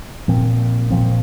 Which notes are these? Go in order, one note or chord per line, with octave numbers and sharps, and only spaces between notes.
A#2 F3 C4
A#2 F3 C4